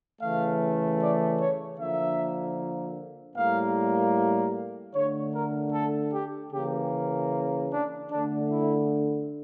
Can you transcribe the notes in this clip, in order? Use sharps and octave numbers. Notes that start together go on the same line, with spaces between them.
C#3 E3 A3 F5
D5
C#5
D3 F3 A#3 E5
A2 G3 A#3 F5
D3 A3 C#5
A#4
A4
G4
C#3 E3 A#3 G4
D4
D3 A3 D4
E4